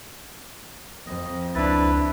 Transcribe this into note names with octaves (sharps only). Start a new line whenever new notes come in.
F2 D#5
C#2 D4 E4 B4 A6